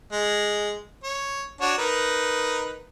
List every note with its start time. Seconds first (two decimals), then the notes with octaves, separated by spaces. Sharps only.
0.12 G#3
1.04 C#5
1.61 D4 F#4 C#5
1.78 D#4 A#4 B4